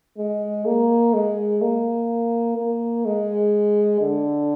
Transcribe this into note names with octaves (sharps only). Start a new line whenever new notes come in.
G#3
A#3
G#3
A#3
A#3
G#3
D3